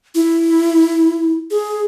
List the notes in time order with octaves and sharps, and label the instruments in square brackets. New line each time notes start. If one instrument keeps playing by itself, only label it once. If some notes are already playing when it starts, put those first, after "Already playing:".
[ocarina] E4
G#4